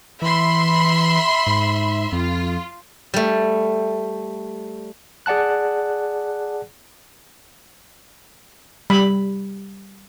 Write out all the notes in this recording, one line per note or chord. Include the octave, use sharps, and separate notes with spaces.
E3 E5 B5 C6
G#2
F2 F4
G3 A3
G#4 D5 F#5 A5 F#6
G3 B5